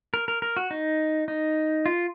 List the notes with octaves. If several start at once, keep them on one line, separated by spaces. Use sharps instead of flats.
A#4
A#4
A#4
F#4
D#4
D#4
F4